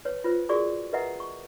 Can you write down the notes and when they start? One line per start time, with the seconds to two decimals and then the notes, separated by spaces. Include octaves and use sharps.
0.05 B4 C#5
0.24 F4 B4 C5
0.49 F#4 G#4 A#4 D5 C#6 D6
0.93 A#4 B4 D#5 E5 F#5 A#5
1.20 C#6